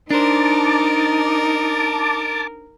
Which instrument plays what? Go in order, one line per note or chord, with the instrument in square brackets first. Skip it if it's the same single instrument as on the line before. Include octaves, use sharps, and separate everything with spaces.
[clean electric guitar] D4 C5 [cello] D#4 [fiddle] A#4 [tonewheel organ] A5 D6